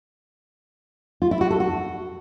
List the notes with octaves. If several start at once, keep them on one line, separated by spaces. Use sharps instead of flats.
F4
E4
F#4
A4
F#4